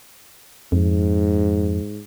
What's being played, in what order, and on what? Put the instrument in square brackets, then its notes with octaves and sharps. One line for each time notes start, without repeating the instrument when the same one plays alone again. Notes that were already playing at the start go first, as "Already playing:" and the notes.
[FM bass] F2 [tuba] G#2